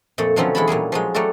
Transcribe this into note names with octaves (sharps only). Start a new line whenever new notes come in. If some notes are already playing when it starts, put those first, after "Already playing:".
F2 A#2 A3 A4
B2 D3 F3 F#3 C4 C#4
E2 G#3 E4 A4 A5 B5
A#2 F#3 G3 G#4
F3 F#3 G#3
F#3 G3 A3 F#4 A4